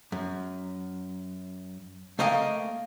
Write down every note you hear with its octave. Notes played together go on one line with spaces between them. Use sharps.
F#2
A3 A#3 D#5 F5 G5